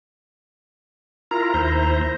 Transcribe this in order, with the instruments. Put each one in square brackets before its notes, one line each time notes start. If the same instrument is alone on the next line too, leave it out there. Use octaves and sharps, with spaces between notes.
[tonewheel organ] E4 F4 A#4 [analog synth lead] A#5
[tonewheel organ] D#2 E4 C5